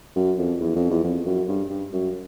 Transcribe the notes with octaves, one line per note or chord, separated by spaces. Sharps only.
F#2
F2
E2
F2
E2
F2
F#2
G2
G2
F#2